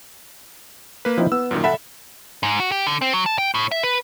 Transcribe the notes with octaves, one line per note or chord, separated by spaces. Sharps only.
A#3 B4
F3 C4 D#4 E4
B3 E6
F#2 A#2 D#3
A4 E5 F#5 A5 B5
G#2
F#4
G4
D3
C4
F#3
A5
G5
A2
E5
B4